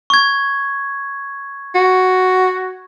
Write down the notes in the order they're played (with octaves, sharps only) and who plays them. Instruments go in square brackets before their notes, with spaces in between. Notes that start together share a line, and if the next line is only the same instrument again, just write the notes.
[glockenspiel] C#6 G#6
[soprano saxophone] F#4